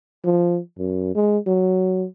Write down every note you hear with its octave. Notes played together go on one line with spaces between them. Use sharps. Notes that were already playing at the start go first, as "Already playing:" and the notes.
F3
F#2
G#3
F#3